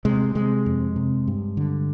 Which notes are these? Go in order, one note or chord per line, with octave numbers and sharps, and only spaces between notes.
C3 G#3
C3 G#3
F2
C3
G2
D3